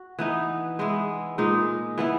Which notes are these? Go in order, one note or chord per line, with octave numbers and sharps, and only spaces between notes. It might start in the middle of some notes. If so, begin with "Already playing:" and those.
Already playing: F#4
E3 B3 D#4
G#3 B3 E4
A#2 G#3 D#4
E3 B3 E4